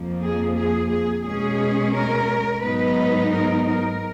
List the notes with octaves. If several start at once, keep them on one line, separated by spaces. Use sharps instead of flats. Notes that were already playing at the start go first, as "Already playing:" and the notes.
Already playing: F2 F3 A#3
G#4
G#4
G#4
B2 G#3 C#4 G#4
A#4
G#2 F#3 B3 D#4 B4
A#4
A#4